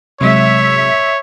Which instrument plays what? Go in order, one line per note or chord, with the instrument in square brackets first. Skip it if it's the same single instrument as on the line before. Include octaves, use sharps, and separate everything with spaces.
[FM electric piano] C3 F#3 G#3 [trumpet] C#5 [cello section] E5